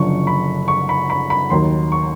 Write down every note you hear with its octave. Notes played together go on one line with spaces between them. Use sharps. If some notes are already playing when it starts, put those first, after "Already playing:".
Already playing: F#1 F#2 D3 F3 C#6
B5
C#6
B5
B5
B5
D#2 D#3 F#3 C6
C#6